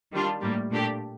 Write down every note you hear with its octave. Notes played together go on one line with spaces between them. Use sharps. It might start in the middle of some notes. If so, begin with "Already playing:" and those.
D#3 G3 D4 F4
A2 G3 A#3
A#2 A3 D4 G4